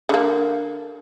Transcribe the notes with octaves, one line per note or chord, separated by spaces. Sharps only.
D3 A#3